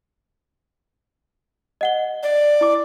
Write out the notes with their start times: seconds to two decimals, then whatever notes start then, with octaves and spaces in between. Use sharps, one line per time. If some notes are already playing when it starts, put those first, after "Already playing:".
1.81 D#5 F#5 G7
2.23 D5
2.61 E4 D6